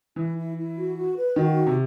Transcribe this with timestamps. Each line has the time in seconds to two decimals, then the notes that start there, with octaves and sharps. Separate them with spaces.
0.16 E3 E4
0.37 E4
0.57 E4
0.77 F#4
0.96 F#4
1.16 B4
1.36 D#3 F#4
1.56 D#4
1.66 C3